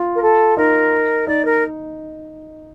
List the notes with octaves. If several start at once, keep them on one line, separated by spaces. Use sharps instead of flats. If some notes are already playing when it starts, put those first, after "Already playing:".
Already playing: F4
A#4
A4
D#4 A#4
D#4 D5
A#4